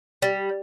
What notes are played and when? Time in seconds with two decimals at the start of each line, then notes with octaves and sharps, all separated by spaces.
0.22 G3